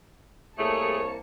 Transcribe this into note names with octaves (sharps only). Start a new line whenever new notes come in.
C2 A3 A#3 G#4 C#5 A5 C#7